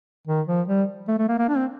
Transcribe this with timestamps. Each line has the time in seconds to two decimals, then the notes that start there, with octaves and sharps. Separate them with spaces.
0.27 D#3
0.47 F3
0.68 G3
1.08 A3
1.19 A3
1.29 A#3
1.39 A#3
1.49 D4
1.57 C4